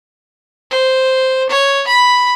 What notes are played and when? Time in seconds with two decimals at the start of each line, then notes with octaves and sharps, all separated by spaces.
0.71 C5
1.50 C#5
1.87 B5